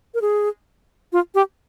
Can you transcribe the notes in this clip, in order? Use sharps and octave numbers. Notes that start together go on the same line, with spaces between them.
A#4
G#4
F4
G4